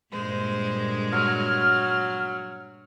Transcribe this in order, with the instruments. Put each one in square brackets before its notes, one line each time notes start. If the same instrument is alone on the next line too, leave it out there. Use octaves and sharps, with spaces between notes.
[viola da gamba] G2 A#2 G#3 [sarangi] C5
[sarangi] F#3 [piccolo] F6